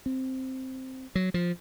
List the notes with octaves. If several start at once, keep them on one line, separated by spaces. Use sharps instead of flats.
C4
F#3
F3